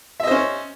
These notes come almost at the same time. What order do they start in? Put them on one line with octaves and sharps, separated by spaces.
E5 D#5 C5 C#4